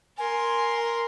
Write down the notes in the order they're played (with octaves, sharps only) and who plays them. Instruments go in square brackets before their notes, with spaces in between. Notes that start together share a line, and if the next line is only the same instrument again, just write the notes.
[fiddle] A#4 C6 [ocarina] G#5